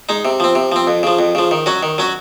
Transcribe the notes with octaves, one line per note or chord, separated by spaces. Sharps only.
G#3 D#4
C3
F3 C4
C3
F3 C4
F2
C#3 F3
F2
C#3 F3
D#3
F#3 C#4 F#4
D#3
F#3 C#4 F#4